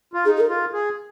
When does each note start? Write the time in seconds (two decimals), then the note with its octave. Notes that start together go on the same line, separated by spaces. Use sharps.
0.14 F4
0.25 D#4 G#4
0.37 G#4
0.40 A#4
0.49 F4
0.73 G#4